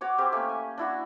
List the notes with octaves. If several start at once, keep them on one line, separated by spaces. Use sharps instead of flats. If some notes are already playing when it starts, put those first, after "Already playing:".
F#4 C#5 D6
C4 G4 A#4
A3 A#3 C#4
G#5
D4 E4 F#4